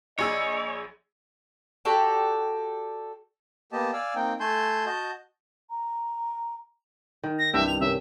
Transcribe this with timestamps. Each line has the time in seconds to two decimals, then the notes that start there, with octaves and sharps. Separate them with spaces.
0.19 A#1 G#4 C#5 D#5 E6
1.85 F#4 G4 A4 D5
3.72 A#3 B3 G4 D#5 A5
3.93 D5 F5 G#5 E6
4.15 A#3 C4 D#4 G5
4.40 A3 G#5 A5 C6 G6
4.86 F#4 D#5 A5 G6
5.70 A#5
7.23 D#3
7.39 A#6
7.54 C2 G2 E5 G5
7.67 F7
7.81 C3 C#4 A#4 E5